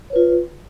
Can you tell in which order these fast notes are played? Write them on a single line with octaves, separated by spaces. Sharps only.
C#5 B4 F4